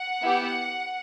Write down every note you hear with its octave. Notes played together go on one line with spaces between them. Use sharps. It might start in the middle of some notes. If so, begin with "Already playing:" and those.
Already playing: F#5
B3 E4 G4